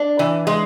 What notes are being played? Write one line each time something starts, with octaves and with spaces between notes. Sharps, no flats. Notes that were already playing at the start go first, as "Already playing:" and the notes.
Already playing: D4
E3
G#3